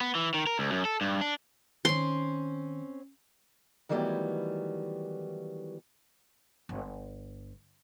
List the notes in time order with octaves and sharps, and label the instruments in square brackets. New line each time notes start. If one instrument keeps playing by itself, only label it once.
[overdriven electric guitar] B3
E3
D#3
A#4
C#2
F#2
A4
G2
D4
[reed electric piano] D#3 [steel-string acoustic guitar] C4 C#4 [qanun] C6
[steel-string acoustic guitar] D#3 E3 F#3 G3 A3 B3
[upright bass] G1